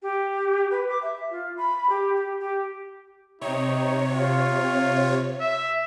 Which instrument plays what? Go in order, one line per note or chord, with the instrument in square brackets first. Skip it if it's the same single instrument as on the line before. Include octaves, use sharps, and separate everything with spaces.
[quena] G4
B4
D6
E5
F4
B5
G4
G4
G4
[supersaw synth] C3 C#5 [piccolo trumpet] D#4
[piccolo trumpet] F4
E5